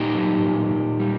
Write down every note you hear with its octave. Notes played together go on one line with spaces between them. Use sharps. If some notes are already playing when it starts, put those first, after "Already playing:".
Already playing: A#2 D#4 G4
F#3
A#2
A#2
G3